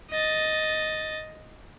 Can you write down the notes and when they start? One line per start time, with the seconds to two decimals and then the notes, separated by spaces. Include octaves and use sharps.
0.11 D#5 A6